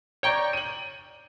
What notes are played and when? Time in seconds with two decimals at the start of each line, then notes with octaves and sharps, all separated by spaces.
0.23 C#5 D5 G5 A#5 C#6 G6
0.53 D#7 F#7